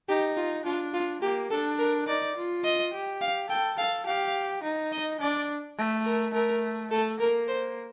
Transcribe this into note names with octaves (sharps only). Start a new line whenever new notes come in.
D#4 G4
F4
D4 F4
F4
A#3 G4
D4 A4
A#4
D#4 D5
F4
D#5
G4
F5
A4 G5
A4 F5
G4 F5
D#4
D#5
D4 D5
A3
A#4
A3 A#4
A3 A4
A#3 A#4
C5